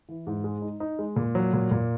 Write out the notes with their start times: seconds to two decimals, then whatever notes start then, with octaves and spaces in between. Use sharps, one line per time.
0.09 E3
0.27 G#2
0.44 G#3
0.62 D#4
0.80 D#4
0.99 G#3
1.16 A#2
1.35 F#3
1.53 A#2
1.71 A#2